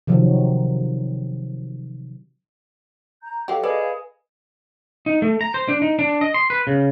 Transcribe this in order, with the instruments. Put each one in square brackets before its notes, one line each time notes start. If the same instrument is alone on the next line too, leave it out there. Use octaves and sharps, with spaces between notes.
[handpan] C3 D#3 F3 F#3
[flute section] A#5 G6
[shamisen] F#3 G4 [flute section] A4 D#5 F5
[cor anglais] G#4 [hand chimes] B4 [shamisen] D5
[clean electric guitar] D#4
A3
A#5
C5
D4
D#4
D4
D#5
C6
B4
C#3